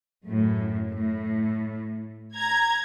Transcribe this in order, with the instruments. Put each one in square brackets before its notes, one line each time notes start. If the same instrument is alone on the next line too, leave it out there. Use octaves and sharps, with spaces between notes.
[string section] F#2 A2
A2
A#5 G#6